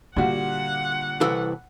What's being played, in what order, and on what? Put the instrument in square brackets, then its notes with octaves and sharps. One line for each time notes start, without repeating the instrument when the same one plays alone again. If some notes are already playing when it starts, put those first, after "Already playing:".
[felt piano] A#2 G3 F#4 [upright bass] D3 [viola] F#5
[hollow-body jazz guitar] C2 E3 A4